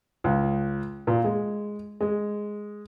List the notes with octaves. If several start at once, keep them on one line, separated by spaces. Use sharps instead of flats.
C#2
A#2
G#3
G#3